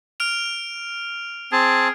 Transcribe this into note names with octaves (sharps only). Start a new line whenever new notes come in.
F6 D7 F7
C4 G#4 A5